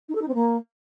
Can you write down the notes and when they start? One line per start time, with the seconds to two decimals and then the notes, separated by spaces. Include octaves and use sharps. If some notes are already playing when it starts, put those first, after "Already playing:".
0.09 D#4
0.15 A4
0.21 D#4
0.28 C4
0.34 A#3